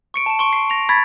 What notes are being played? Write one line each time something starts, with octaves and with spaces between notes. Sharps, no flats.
C#6 C#7 D7
A5 E7
C6 C#6 D7
C7 D7
A#6 F7
B5 G#6 A6 B6